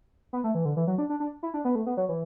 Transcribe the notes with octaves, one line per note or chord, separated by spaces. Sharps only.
B3
A3
E3
D3
E3
F#3
D4
D4
D4
E4
D4
B3
A3
B3
F#3
E3